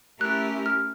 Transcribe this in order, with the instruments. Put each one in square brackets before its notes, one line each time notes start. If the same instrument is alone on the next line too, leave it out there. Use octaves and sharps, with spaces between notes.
[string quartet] A3 C#4 E4 G4 A#4 [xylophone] F#6
[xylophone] F6